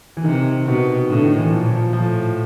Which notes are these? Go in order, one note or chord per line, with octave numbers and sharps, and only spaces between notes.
E3
C3 D#3
B2 D#3
A2 D3
D#3
E3
A#2 F3
F3
A2 F3